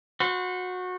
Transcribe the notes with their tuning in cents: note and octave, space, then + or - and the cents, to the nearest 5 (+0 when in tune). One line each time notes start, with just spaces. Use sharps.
F#4 -20 C5 -35